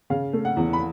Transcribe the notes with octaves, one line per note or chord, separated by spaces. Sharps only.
C#3 F5
A3
F#5
E2
B5